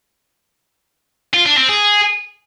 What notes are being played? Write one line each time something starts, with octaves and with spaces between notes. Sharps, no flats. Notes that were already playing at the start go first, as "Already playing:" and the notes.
F4
D4
C4
G#4